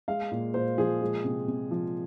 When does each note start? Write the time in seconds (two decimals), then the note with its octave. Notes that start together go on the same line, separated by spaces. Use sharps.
0.08 G#3 F5
0.31 A#2
0.54 A#2 C5
0.78 F3 G#4
1.01 G#3
1.25 C3
1.48 C3
1.71 F3